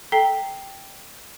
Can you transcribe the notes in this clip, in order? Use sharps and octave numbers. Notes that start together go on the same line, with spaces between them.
A4 G5 A#5 B6 C7 G7